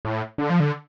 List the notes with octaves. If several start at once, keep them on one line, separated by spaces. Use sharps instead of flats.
A2
D3
F3
D3